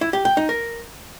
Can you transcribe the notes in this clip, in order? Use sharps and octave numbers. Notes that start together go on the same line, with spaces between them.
E4
G4
G5
D#4
A#4